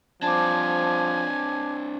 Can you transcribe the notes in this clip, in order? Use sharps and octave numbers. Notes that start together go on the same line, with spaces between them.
F3 C4 D4 G#5 A5 D6